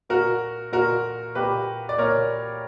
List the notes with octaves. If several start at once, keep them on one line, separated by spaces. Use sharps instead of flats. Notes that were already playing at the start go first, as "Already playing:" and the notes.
A#2 F#4 A#4
A#2 F#4 A#4
A#2 G4 B4
D5
A#2 A#4 C#5